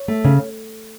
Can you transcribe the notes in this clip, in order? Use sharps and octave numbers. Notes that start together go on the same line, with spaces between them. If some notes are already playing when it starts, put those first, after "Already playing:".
Already playing: C#5
A3
C#3